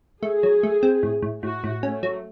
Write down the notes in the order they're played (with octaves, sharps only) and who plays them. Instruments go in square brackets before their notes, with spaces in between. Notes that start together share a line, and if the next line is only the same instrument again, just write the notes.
[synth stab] A3 [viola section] G#4
[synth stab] F#3
A3
C4
A2
A2
[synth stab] A2 [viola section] F#4
[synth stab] A2
[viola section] A3 [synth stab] C#4
[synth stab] F#3